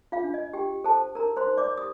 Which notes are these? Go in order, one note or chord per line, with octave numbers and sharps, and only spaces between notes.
F4 F5
D4
D#5
G4 G5
A4 C5 A5
D#4 A#4 A#5
C5 C6
D#4
D5 D6
G4 D#6